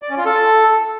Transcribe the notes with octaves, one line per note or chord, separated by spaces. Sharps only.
D5
C#4
F4
A4